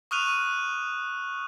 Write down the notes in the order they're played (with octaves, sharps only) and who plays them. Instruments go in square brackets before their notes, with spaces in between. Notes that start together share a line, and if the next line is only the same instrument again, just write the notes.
[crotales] C#6 D#6 F6 F#6 D#7 F7